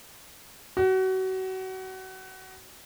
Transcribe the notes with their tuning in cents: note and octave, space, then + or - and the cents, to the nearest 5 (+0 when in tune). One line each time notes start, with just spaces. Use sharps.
F#4 +30